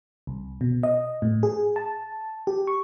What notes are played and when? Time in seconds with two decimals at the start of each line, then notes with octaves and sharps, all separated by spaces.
0.27 C2
0.61 B2
0.83 D#5
1.22 A2
1.43 G#4
1.76 A5
2.47 G4
2.67 C#6